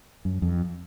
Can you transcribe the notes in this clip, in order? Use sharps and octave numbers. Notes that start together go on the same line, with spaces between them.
F#2
F2